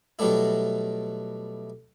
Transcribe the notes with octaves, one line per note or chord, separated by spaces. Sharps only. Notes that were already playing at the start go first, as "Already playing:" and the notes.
B2 F#3 G3 A3 E4